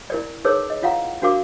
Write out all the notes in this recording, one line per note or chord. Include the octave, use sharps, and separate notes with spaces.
E4 A#4 D5
D#4 G#4 A#4 B4 C#5 E6
D#5
E4 F4 F5 F#5 A#5
D4 F#4 A#4 F5 D6